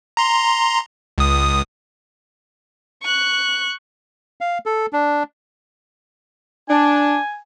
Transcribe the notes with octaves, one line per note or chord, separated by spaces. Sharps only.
A#5 C6
C#2 D#6
C#6 F#6
F5
A4
D4
D4 G#5